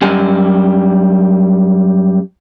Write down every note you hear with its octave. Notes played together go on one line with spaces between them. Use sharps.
F#2 F#3 G3 G#5